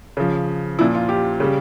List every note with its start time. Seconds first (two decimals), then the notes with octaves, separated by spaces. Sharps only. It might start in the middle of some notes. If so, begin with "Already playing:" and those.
0.17 C#3 F3
0.78 A#2 F3 E4
0.95 F4
1.09 G4
1.40 C#3 G3